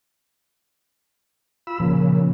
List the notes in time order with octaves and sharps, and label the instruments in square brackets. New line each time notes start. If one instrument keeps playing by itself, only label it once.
[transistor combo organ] F4 B5 E6
[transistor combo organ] A#2 C#3 [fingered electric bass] F3